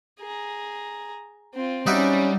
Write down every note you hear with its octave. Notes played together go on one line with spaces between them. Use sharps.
G#4 A#5
C4 F4
G3 C#4 D#4 E4 F#4 D5